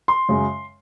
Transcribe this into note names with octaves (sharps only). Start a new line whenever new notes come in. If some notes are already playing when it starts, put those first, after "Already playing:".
C6
F#2 C#3 G#3